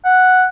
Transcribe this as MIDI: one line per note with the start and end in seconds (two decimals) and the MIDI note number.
0.05 0.45 78